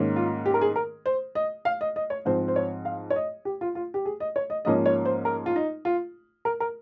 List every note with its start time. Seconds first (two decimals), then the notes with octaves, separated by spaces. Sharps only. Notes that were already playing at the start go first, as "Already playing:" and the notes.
Already playing: G#2 D#3 A#3 C#4
0.16 F4
0.46 G4
0.54 A#4
0.61 G#4
0.76 A#4
1.06 C5
1.35 D#5
1.65 F5
1.81 D#5
1.96 D#5
2.10 C#5
2.25 G#2 F3 C4 C5
2.48 C5
2.56 C#5
2.85 F5
3.10 C#5
3.16 D#5
3.45 G4
3.61 F4
3.75 F4
3.94 G4
4.05 G#4
4.20 D#5
4.36 C#5
4.50 D#5
4.65 G#2 F3 A#3 C#4 D#5
4.86 C#5
5.05 C5
5.25 A#4
5.46 F4
5.56 D#4
5.85 F4
6.45 A#4
6.60 A#4